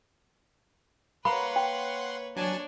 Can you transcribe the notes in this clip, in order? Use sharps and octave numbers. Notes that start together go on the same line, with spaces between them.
A#3 B4 C#5 F#5 B5 C6
G5
F#3 D4 C#5 G#5 A5